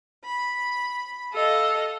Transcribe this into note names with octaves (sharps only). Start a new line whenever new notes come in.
B5
A4 D#5 F5